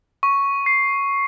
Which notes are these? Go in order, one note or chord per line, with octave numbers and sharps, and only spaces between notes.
C#6
C7